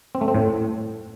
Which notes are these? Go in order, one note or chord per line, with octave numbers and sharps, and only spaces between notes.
C4
A3
C4
A2